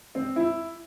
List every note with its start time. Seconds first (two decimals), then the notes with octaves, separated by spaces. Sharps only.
0.15 C4
0.36 E4